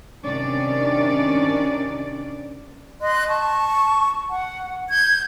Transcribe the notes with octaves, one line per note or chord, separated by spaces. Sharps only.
C3 D#3 C#4 D4 D5
D#5 C6 F#6
A5 C#6
F#5
G6 G#6